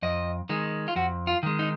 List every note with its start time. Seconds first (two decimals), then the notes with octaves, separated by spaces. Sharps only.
0.02 F2 D#5
0.49 D#3 G#3
0.88 F4
0.96 F2 F#4
1.27 F4
1.43 D#3 G#3
1.59 D#4